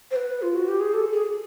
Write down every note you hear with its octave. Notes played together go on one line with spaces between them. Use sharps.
C5
B4
F4
F#4
G4
G#4
A4
G#4